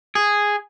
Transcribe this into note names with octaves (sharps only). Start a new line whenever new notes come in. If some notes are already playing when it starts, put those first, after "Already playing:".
G#4